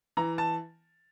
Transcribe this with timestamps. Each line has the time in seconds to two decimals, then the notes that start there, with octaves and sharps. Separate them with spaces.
0.17 E3 A#5
0.38 A5